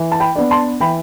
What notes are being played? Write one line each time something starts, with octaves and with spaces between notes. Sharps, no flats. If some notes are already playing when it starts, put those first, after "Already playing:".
Already playing: E3
A5
G5 B5
B3 D4
A5 C6
E3 G5 B5